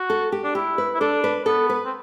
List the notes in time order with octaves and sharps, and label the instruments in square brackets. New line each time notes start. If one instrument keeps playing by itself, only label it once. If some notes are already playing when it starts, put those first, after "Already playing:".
Already playing: [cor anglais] F#4
[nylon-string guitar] A4
G4
[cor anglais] D4
[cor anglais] E4 [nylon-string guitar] G4
[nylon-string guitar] B4
[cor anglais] E4
[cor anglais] D4 [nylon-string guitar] A4
[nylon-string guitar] B4
[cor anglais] B3 [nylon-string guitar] A4
[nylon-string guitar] B4
[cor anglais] C4